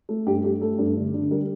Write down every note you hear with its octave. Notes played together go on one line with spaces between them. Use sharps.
A3
G2 G4
A3 G4
A3 A4
G2
D3
D3
G3 A#4